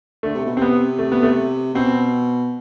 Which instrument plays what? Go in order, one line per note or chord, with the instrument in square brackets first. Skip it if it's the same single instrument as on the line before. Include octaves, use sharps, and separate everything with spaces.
[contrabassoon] D3 [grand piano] A3
[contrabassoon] C3
B2
[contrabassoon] C3 [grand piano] C4
[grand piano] B3
A3
B3
A3
[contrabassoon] B2 [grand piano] C4